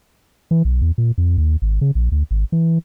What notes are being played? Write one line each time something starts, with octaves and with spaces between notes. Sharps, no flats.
E3
B1
E2
A#2
F2
D#2
G#1
C#3
A#1
D2
G#1
E3